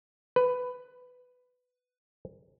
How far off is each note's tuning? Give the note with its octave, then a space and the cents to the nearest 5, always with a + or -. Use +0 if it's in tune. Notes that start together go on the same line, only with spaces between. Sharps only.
B4 +10